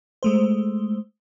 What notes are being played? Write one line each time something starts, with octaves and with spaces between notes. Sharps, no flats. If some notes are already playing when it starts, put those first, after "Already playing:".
G#3 A3 C5